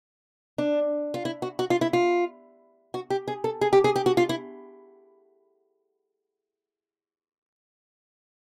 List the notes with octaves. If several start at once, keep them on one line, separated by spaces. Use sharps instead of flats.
D4
F4
E4
F#4
F#4
F4
E4
F4
F#4
G4
G#4
A4
G#4
G4
G#4
G4
F#4
F4
E4